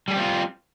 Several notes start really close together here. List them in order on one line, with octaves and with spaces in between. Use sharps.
G3 G#4 G4 C4 F4